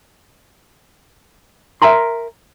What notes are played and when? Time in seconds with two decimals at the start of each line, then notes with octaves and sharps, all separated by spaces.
1.82 A#4 E5 G#5 A#5 C6